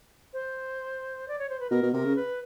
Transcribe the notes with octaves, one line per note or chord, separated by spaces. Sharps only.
C5
D5
C#5
C5
B4
B2 A#4
B2
C3 A#4
C#3
B4